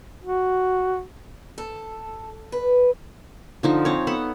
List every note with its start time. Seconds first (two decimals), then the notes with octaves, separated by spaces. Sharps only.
0.23 F#4
1.58 A4
2.52 B4
3.63 D3 F3 D#4
3.85 C4 C#5
4.07 B3 A4 F#5